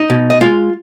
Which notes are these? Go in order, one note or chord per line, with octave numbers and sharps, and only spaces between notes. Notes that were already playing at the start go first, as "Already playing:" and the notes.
Already playing: D#4 D#5
B2
D#5
G#3 F4 F5